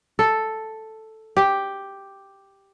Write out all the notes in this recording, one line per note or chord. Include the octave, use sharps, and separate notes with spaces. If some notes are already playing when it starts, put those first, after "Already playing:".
A4
G4